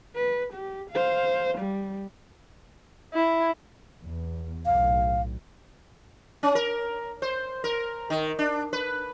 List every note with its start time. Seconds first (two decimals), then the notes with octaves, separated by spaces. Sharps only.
0.16 B4
0.53 G4
0.91 C5 F5
1.58 G3
3.14 E4
4.02 E2
4.66 B1 A2 F5
6.43 C#4
6.55 A#4
7.22 C5
7.64 A#4
8.10 D#3
8.39 D4
8.73 B4